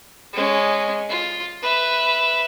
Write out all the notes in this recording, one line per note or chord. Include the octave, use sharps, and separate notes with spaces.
G#3 C#4
F4
B4 E5